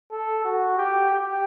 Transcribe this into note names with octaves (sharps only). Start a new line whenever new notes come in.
A4
F#4
G4
G4